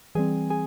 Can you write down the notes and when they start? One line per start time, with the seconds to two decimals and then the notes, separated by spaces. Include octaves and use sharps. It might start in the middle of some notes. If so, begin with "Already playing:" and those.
0.15 E3 G3 C4 G#4 G#5
0.50 G#4 G#5